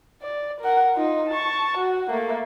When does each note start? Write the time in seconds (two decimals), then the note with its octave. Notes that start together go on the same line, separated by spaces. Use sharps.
0.22 D5
0.61 A#4 F#5
0.95 D#4 F4
1.29 A5 C#6
1.78 F#4
2.10 A3 A#3